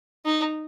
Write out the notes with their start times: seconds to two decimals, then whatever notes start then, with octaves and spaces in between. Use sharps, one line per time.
0.26 D#4